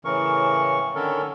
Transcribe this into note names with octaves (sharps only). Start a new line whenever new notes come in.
A2 C#3 E3 A#4 C#6
D3 D#3 C#4 A4 A#4